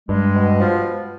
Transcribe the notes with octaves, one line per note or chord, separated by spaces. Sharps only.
G2 G#3
B2
F3